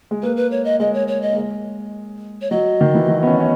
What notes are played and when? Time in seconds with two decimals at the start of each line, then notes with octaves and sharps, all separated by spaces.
0.11 G#3
0.23 A#3 B4
0.37 B4
0.51 C#5
0.65 D#5
0.80 G#3 D#5
0.94 C#5
1.08 C#5
1.22 D#5
1.32 A#3
1.36 G#3
2.41 C#5
2.51 F#3 D#5
2.81 D#3
2.95 E3
3.08 F#3
3.23 B3
3.27 C#4
3.40 C#4